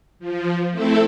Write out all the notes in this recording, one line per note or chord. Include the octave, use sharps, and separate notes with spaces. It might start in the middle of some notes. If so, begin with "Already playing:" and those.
F3
A3 C4 E4 A4